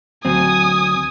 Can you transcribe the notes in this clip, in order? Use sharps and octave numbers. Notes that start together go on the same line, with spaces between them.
D2 F#3 C4 G#5 D#6